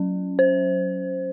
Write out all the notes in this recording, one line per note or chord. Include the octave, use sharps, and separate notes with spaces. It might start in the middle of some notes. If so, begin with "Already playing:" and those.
Already playing: F#3 C#4
C5